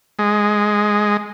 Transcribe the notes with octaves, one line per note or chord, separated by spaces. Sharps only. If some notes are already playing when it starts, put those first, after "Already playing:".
G#3